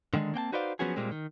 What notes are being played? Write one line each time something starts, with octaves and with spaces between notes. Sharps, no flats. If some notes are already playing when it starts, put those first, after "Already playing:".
D3 D#3 F#3 G#3 D4
A#3 C4 G5 A5
D#4 F#4 B4 C5 D5 F5
F3 F#3 B3 C#4 F#4 G#4
A#2 G3 G#3 A#3 C4
D#3